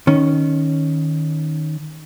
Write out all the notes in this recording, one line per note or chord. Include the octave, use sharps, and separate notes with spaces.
D#3 C#4